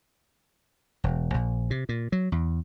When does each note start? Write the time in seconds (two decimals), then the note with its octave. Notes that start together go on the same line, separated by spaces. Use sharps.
1.04 E1
1.34 A#1
1.71 C3
1.89 A#2
2.12 F#3
2.32 E2